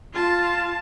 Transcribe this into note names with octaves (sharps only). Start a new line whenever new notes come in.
F4 A5